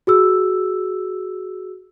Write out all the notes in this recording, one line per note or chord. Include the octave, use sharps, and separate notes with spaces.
F#4 G#4 E6